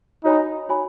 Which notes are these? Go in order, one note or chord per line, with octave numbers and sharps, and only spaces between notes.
D#4 F#4 C#5 G#5 B5
F#4 C#5 G#5 B5